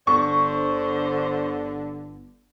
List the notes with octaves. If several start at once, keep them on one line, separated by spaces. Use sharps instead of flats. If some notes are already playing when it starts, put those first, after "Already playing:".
G1 D3 C5 C#6